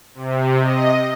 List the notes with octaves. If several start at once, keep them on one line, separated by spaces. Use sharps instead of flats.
C3
D#5